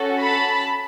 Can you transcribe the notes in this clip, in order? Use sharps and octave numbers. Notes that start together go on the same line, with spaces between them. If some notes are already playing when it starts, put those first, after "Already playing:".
Already playing: C#4 F#4 A4
A5 B5